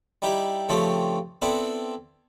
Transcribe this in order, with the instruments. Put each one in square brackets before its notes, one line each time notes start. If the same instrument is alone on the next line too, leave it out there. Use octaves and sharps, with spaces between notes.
[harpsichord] G3 D#4 E4 G4
G2 C#3 F3 A3 C4 G4
B3 C4 D4 E4 A4